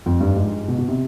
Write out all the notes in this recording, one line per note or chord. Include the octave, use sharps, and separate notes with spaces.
F2
G2
G#2
B2
B2
C3